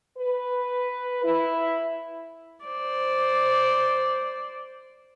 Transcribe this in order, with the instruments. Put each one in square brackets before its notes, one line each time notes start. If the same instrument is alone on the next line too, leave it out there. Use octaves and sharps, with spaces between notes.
[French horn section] B4
E4
[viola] C5 D5